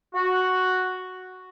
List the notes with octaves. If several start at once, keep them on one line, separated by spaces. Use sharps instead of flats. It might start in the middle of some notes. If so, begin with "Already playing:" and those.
F#4